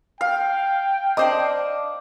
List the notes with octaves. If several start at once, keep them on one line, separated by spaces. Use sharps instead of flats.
F5 G5
D4 C5 D#5 D6